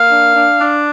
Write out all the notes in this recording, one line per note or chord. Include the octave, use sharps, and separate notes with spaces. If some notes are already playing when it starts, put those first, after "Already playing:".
Already playing: A#3 F5
D4
D4
D4